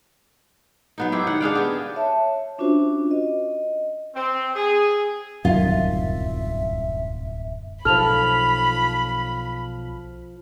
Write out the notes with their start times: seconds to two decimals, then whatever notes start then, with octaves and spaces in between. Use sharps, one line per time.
0.98 F#3 B3 D#4
1.12 E4 G4 C5
1.27 D#3 F#5
1.41 D4 G#4 F5 G5
1.55 B3 G4
1.96 C#5 E5 A5
2.58 C#4 D4 F4 F#4 C5
3.11 D#5
4.15 C4
4.55 G#4
5.45 D1 C2 F#2 D#3 F4 E5
7.85 B1 F3 A4 B5 F6 F7